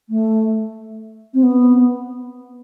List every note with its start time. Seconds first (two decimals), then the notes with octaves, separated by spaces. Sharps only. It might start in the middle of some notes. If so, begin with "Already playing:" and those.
0.09 A3
1.34 C4
1.43 B3